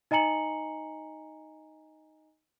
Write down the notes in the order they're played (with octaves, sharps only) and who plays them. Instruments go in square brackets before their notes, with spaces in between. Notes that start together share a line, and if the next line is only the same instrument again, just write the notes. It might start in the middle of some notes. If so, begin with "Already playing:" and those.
[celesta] D#4 D#5 G#5 A#5 C#7 F#7